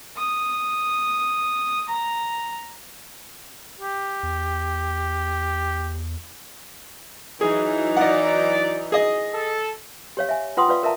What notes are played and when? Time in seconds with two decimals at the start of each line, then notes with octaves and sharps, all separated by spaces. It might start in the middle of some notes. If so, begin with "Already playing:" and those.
0.17 D#6
1.89 A#5
3.79 G4
4.23 E2
7.41 E3 F#3 D#4 G#4
7.97 D5 D#5 F#5
8.92 G#4 D#5
9.32 A4
10.17 G4 C#5 F5
10.29 E5 G#5
10.57 F4 B4 F#5 G5 C6 D#6
10.68 F4 B4 D5 F5
10.83 A#4 D5 E5 F5 A5 A#5